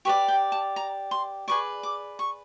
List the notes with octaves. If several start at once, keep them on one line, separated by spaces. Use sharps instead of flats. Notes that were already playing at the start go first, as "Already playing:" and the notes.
G4 B4 D5 C#6
G5
A5
A#5
C6
G#4 B4 D5 C#6
D6
C#6